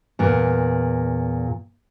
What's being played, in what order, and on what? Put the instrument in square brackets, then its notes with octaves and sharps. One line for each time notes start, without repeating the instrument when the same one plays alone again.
[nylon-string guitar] E2 A#2